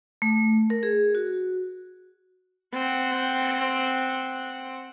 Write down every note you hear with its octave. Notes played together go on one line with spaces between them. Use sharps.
A3
A#4
G#4
F#4
C4 F#5